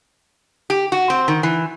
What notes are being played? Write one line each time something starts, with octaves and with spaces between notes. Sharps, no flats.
G4
F#4
C4
D#3
E3